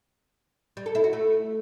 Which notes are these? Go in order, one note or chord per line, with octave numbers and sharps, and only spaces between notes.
G3
A4
E4
F#4
A3